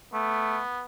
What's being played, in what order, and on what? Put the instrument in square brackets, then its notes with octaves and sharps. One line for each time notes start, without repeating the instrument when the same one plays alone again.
[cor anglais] A3 [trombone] B3